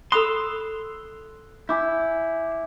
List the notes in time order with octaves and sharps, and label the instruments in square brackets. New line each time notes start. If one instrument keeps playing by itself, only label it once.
[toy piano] A4 B5 D#6 [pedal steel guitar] C6 E6 [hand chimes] F#6
[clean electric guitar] E4 [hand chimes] G#5 D6 G6